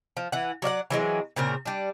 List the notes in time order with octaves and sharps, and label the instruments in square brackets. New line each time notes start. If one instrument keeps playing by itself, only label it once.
[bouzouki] F3
E3 F#5
F#3 D5 F5 F#5
E3 F#3 G#3 C4
A#2 C#3 C4 A#4
G3 D4